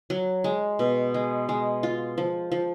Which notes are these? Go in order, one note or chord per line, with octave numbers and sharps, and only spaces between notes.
F#3
G#3
B2
G#3
G#3
F4
F3
F3